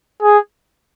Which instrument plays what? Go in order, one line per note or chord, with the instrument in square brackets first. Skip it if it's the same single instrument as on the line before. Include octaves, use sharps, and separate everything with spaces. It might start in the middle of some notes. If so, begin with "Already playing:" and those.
[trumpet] G#4